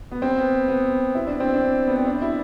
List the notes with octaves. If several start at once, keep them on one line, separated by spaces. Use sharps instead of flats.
B3
C4
B3
B3
E4
D4
C4
D4
B3
C4
D4
E4